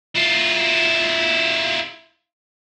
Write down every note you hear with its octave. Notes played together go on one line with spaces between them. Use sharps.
E4 F4